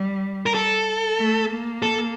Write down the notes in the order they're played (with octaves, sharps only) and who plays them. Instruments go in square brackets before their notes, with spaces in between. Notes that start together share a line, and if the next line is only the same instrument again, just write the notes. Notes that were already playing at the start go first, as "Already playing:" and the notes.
Already playing: [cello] G3
[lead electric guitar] A#4
A4
[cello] A3
A#3
[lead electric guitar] A4